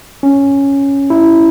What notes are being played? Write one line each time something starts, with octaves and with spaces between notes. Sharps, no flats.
C#4
E4